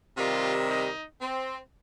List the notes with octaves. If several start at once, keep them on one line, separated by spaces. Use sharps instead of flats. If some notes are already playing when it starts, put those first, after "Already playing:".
C3 D#3 G3 F4
D#4
C4